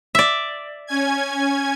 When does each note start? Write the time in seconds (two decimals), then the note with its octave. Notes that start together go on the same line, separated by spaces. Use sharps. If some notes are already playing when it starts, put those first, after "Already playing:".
0.15 D5 E5
0.87 C#4 G#5 G#6